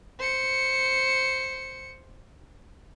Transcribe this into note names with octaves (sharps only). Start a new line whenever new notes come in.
C5 C#7